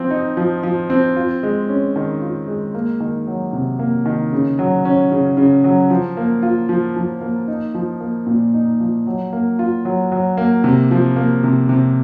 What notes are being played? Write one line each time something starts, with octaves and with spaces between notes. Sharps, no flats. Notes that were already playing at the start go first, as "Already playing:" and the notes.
Already playing: F3 C4
D#4
F3
F3
C4
F4
G#3
C#4
D#3
F4
G#3
A#3
D#3
F#3
C3
A#3
D#3
C#3
F#3
C#4
C#3
C#3
F#3
F3
A#3
F4
F3
F3
A#3
D#4
F3
A#3
A#2
D#4
F3
F#3
A#3
F4
F#3
F#3
A#3
C3
F3
A#3
C3
C3